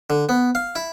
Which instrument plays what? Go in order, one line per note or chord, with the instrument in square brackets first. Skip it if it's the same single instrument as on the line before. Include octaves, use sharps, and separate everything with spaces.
[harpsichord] D3
B3
F5
E4